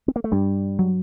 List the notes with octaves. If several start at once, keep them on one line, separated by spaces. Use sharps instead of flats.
C4
A#3
A3
G2 G3
F#3